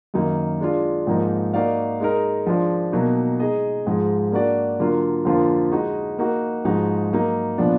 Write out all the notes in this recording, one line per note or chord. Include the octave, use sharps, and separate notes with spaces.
F#2 D#3 F#3 A#3 D#4
G#3 D4 F4
G#2 F3 A#3 D#4
A#3 D#4 F#4 D5 F5
G#3 D#4 A#4
F3 G#3 D4 F4
B2 F#3 A#3 D#4
G#3 D#4 G#4 D#5
G#2 F3 G#3
A#3 D4 F#4 D5
D3 F#3 A#3 F4
F2 D3 F3 A#3 F4
G#3 D#4 F#4
A#3 D#4 F#4
G#2 F3 G#3 D#4 F#4
F#3 A#3 D#4
A#2 F3 B3 D4